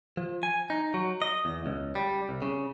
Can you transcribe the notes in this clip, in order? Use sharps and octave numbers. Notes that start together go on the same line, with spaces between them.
F3
G#5
D#4
F#3
D#5
E2
C#2
G3
C2
C#3